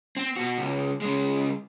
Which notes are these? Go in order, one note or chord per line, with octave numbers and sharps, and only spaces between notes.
C4
B2 F#4
C#2
C#3 G#3